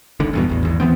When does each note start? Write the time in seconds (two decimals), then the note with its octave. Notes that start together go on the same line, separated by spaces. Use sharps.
0.20 G#1 C#2 G#2 D3
0.33 E2 G2 B2
0.49 A1 E2
0.63 G#1 E2
0.80 D#2 E3 B3 C4